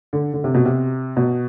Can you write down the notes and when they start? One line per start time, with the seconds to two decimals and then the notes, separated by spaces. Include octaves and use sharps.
0.13 D3
0.34 D3
0.44 C3
0.54 B2
0.65 C3
1.17 B2